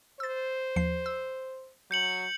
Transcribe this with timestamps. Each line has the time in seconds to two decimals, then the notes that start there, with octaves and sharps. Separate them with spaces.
0.20 C5 E6 A6
0.76 D#2 F3 C7
1.06 E6
1.91 F#3 G6 C#7 F#7